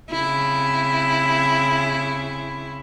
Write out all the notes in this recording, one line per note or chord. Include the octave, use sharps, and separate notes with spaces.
C#3 C4 E4